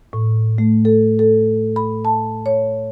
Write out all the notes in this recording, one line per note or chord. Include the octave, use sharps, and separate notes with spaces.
A2
A3
A4
A4
B5
A5
C#5